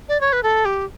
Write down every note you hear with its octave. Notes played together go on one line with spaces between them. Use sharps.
D5
C#5
B4
A4
G4